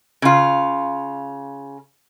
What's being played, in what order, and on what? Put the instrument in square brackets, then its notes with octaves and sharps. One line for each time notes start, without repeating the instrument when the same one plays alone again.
[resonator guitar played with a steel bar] C#3 F4